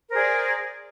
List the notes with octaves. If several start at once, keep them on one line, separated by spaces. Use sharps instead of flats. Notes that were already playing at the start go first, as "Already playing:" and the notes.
G#4 A#4 C5 D5